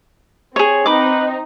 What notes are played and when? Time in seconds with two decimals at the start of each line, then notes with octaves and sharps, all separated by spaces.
0.56 C4 G#4 C#5
0.86 C4 D#4 B4 D6